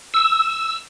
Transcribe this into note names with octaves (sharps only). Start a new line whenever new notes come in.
E6